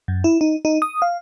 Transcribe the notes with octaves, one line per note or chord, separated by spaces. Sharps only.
F#2
E4
D#4
D#4
D#6
F5